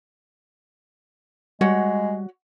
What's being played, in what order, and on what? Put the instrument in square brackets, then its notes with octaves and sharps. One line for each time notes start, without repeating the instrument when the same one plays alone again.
[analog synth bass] G3 [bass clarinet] G#3 [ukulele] F#4 C#5 F#5